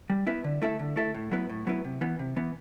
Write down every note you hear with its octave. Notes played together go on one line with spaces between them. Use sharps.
G3
B3 E4 B4 E5
D3
A3 E4 A4 E5
D3
A3 E4 A4 E5
A2
F#3 B3 E4 B4
A2
F#3 B3 E4 B4
C3
E3 B3
C3
E3 B3